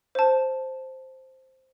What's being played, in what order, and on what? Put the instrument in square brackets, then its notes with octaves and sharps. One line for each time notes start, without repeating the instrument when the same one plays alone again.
[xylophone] C5 A5